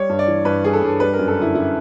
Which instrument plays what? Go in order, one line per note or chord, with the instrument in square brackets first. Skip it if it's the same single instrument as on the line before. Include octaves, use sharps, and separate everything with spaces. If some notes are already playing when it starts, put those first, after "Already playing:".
Already playing: [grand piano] G3 C#5
G2
D5
E3
G2 B4
G3 G#4
A4
G2
G3 B4
A#4
F#2
A4
D3 E4
F#2 E4